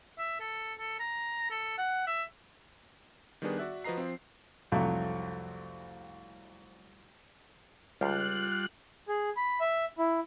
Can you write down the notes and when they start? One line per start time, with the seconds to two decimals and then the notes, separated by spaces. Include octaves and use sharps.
0.18 E5
0.40 A4
0.78 A4
0.99 A#5
1.50 A4
1.78 F#5
2.07 E5
3.42 D#3 G3 B3 D4 G#4 B4
3.58 F#4 D5 E5 F#6
3.84 F3 F#4 B4 D#5 A#5 C7
3.98 F3 C4
4.72 C2 F2 F#3 A3
8.01 C#2 G3 F4 F#6
9.08 G#4
9.37 B5
9.60 E5
9.98 E4